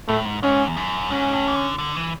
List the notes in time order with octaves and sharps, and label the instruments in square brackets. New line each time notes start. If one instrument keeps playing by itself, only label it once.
[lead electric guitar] A2 [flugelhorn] A3
[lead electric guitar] G#2
[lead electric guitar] G#2 [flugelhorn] C#4
[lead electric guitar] E2
F#2
[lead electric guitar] G#2 [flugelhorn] C#4
[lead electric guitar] A2
E3
D3
D3
E3